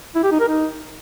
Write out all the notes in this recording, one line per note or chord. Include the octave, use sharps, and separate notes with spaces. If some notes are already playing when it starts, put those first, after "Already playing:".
E4
G4
D#4
A#4
D#4